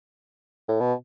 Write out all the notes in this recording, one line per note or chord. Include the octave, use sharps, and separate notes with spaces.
A2
B2